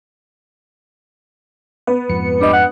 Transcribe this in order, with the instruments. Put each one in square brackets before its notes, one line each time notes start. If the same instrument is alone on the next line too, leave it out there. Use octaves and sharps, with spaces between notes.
[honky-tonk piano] B3 [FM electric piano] B4
[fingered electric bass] F2 G#2 F3 [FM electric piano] C#7
[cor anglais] G3 [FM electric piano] D4 D#5
[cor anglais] F#5